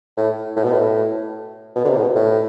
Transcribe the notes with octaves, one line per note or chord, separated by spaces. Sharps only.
A2
A2
B2
A2
B2
D3
C3
A2
B2
A2